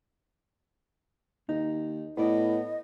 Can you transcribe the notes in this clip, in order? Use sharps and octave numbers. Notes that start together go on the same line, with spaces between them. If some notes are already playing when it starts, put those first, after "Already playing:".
D#2 D#4
A2 B3 D5 D#5